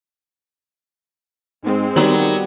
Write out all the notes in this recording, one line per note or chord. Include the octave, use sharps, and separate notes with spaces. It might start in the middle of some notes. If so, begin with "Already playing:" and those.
G#2 G#3 C4
D#3 F#3 G3 B3